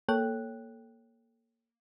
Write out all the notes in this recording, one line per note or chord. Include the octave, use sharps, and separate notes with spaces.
A#3 A4 C#5 G5 F#6